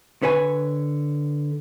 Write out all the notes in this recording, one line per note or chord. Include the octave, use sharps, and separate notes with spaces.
D3 B4 C#5 G#5